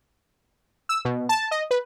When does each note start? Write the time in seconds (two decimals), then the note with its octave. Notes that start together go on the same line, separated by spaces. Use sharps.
0.89 E6
1.05 B2
1.29 A5
1.51 D#5
1.71 B4